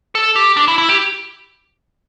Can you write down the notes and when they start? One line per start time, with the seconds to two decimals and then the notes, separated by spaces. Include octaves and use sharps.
0.15 A4
0.36 G4
0.57 D4
0.68 E4
0.78 E4
0.89 G4